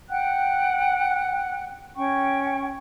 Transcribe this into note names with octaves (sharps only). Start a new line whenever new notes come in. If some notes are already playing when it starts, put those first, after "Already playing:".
F#5 G5 F#6
C#4 G5 C#6